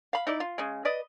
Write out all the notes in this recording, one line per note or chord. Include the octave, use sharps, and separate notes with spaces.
F5 B5
D#4 E4 D5
F4
C#3 G#3
B4 D5 D#5